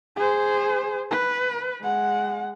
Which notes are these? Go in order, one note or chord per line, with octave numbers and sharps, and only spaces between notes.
G#4 C5
B4
G#3 F#5